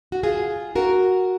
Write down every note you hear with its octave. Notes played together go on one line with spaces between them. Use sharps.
F#4
F4 G#4
F#4 A#4